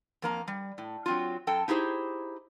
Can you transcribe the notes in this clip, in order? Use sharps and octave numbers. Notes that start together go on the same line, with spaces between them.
F2 A#3 A#5
G3
A2
F#3 C4 F4
F#2 A4 G5 A5
D#4 E4 G4 G#4 C5